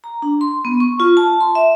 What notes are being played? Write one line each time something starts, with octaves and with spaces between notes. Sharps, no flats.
A#5
D4
C6
B3
C#6
F4
A5
C6
E5